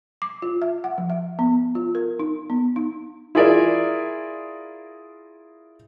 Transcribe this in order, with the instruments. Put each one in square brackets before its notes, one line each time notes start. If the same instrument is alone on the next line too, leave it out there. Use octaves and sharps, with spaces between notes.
[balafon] D6
F4
E5
F#5
F3
E5
B3
F4
A#4
D#4
B3
D#4
[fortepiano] E4 F4 G#4 A#4 D5 E5